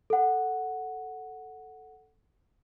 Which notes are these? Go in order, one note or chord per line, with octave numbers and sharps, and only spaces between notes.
A4 F#5